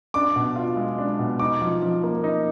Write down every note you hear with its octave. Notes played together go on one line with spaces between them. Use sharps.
D4 D6
B2
F4
G#3
D4
B2
D#4 D6
F3
F3
A#3
D#4